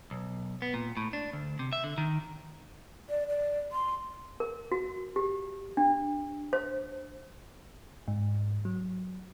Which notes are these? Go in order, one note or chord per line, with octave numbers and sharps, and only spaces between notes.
B1
B3
A#2
A2
D4
D2
C3
E5
D3
D#3
D5
D5
C6
A#4
F#4
G4
D4
C5
G#2
F#3